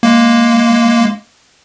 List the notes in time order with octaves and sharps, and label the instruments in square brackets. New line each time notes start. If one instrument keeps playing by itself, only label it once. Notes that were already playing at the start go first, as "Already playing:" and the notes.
[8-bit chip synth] G#3 A#3